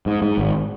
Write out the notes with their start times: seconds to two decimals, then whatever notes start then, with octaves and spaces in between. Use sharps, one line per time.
0.06 G#2
0.22 G#2
0.38 G#1